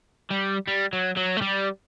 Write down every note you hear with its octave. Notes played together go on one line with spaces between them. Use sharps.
G3
G3
F#3
F#3
A3
G3